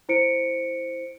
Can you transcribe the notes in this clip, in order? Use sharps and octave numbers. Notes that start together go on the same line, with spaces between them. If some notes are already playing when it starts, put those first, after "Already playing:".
E4 C5 C#7 D7